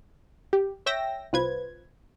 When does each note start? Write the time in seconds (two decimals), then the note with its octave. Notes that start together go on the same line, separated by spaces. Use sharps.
0.53 G4
0.86 C#5 E5 G5 E6 A#6
1.33 C2 F4 B4 C5 G#6